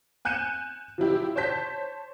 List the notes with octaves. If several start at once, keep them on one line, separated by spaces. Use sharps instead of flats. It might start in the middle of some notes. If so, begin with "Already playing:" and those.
G#5 F#6 G6 C#7 D#7 E7
F3 F#3 E4 G4
C5 C#5 A5 G6 B6